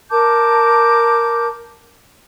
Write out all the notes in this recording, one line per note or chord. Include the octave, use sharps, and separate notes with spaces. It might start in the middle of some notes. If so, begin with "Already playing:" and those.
A#4 A5 D6 G6